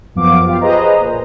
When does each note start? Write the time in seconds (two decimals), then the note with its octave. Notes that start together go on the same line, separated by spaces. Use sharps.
0.15 F#2 F3 B3 F5 D6
0.45 F4 G4 F5
0.61 G#4 B4 C5 D#5 A#5
1.00 A#2